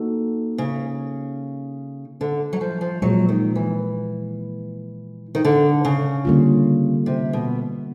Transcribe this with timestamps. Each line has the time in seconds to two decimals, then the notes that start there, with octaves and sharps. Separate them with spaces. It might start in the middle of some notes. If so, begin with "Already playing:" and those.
Already playing: A#3 D#4 F#4 A4
0.58 C#3
2.21 D3
2.53 F#3
2.61 F3
2.81 F3
3.02 A#2 F3 F#3 G#3
3.29 D#3
3.55 E3
5.35 D#3
5.45 D3
5.85 C#3
6.25 D3 G3 A#3 C#4 F4
7.06 C3
7.33 B2